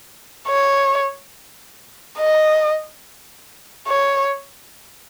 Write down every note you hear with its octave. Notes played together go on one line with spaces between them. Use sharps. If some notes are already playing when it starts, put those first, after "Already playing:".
C#5
D#5
C#5